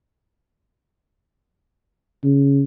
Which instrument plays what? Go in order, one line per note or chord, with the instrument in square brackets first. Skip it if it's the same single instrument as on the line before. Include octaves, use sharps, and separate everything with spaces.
[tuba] C#3